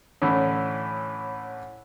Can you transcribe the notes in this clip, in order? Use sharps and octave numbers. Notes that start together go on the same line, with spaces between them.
A2 D3 E3 C#4